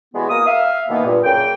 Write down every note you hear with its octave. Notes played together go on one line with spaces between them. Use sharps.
E3 G3 G#3 B3 E4 F#4
A#3 A#4 D#6
E5 F5
B2 D#3 E3 A#3 B3
G2 A#2
F#2 C#3 A#3 G5